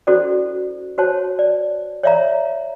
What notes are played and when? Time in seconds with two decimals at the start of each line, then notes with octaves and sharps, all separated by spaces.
0.07 C#4 E4 F#4 A4 C5 D5
0.98 F#4 C5 C#5 A5
1.39 D5
2.03 C#5 D5 E5 F5 A#5